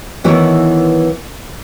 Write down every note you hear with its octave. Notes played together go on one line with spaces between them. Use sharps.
D#3 E3 B3 E4 C#5